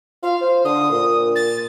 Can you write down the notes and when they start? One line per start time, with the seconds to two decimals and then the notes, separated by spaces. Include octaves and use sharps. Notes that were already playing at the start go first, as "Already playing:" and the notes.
0.23 F4 F5
0.41 C5
0.65 D3 D#6
0.91 A#2
1.36 A6